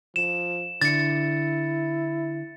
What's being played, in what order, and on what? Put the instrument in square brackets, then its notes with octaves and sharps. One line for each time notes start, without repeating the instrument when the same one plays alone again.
[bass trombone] F3 [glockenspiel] E7
[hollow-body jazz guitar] D3 [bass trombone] E4 [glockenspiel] A6 C#7